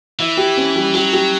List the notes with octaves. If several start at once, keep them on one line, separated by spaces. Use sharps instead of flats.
E3 E4
G4
C#4
G3
F#3 G4
G4